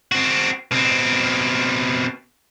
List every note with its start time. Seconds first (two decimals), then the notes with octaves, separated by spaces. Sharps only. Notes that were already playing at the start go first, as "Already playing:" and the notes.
0.12 C4 F#4
0.71 B2 C4